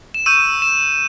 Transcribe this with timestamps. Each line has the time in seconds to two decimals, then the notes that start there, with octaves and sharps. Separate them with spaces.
0.14 E7
0.26 C#6 E6 G6 D#7
0.62 E7